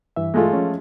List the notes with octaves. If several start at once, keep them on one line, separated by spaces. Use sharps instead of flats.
G2 E3 E5
G#3 A3 F4
F3 C#4